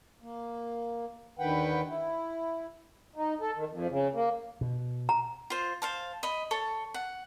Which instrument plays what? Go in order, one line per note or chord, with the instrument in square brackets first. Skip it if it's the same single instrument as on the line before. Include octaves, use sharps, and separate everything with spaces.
[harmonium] A#3
D#2 D3 D#3 B4 F#5 G5
E4
D#4
A4
D#3
F2
C#3
A#3
[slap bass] B2
[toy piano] A#5
[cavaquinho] F4 C5
C5 F5 A5
D#5 B5
A4 C#5
F#5